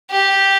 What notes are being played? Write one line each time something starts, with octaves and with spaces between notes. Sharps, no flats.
G4